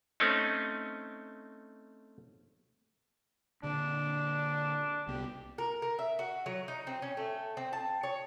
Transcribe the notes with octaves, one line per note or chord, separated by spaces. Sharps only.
A3 C4 C#4 D#4
A#2 D3 D4
C2 B3 G4
A#4
A#4
E5
F#4
F#3
D#4
C4
C#4
A3
C4
A5
C#5